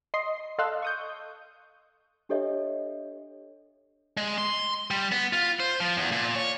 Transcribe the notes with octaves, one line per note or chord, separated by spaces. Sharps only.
D#5 C6 C7
A4 D#5 F5 C6 E6 F#6
C#6 D#6 G6
D4 G4 A4 C#5 D#5 E5
G#3
C6
G3
B3
F4
C5
F3
E2
A#2
C#5